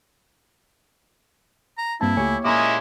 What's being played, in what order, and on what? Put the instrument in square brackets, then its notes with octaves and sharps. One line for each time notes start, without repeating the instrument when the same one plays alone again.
[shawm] A#5
[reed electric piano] G2 C4 A5 [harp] A#3 [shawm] E4
[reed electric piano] C#2 A3 G#5 [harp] G4 C#5
[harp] A#2 [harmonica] G#3 C#4 E4 [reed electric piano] A#3 A#5 D6 [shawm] D#5